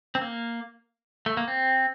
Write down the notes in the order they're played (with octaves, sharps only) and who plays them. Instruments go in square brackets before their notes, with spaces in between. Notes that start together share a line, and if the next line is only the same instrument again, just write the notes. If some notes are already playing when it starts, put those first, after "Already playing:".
[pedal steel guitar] C4
A#3
A3
A#3
C4